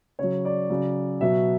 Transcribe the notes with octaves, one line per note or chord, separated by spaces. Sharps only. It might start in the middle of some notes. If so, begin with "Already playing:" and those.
C#3 F#3 C#5
D5
C#3 F#3
B2 F#3 E5